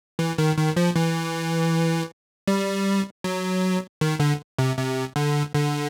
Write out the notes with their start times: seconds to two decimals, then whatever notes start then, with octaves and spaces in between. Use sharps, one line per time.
0.19 E3
0.38 D#3
0.57 D#3
0.76 F3
0.96 E3
2.48 G3
3.24 F#3
4.01 D#3
4.20 D3
4.59 C3
4.77 C3
5.16 D3
5.54 D3